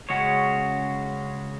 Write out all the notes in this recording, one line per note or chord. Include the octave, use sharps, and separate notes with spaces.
C#3 G#3 C#4 F#4 C#5